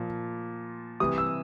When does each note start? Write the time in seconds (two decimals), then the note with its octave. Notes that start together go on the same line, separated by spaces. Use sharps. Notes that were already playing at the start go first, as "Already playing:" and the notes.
Already playing: A#2 F3
1.00 C3 E3 G3 D#6
1.18 E6